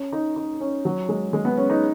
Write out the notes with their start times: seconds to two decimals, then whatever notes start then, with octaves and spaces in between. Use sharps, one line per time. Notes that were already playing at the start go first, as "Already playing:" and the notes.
Already playing: C#4
0.13 D#4
0.36 D#4
0.60 C#4
0.85 F#3
1.09 G#3
1.33 G#3
1.45 B3
1.57 C#4
1.70 D#4